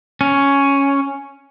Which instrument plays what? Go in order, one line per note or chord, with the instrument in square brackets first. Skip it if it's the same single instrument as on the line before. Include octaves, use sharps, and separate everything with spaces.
[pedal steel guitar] C#4